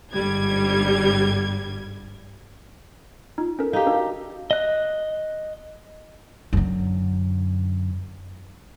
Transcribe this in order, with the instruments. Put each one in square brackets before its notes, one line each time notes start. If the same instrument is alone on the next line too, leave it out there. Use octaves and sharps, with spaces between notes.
[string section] G1 G#2 D3 G3 G#6
[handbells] D#4 [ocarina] F4
[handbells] C#4 A#4 [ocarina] A4
[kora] D#4 G4 [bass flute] F5
[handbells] D4 A4 A#4 [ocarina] F#4
[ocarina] F#4
[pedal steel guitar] D#5 F#6
[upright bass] F#2 D3